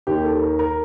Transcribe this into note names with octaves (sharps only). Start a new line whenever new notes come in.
D#2 D#3 G4
A4
A#4
A#4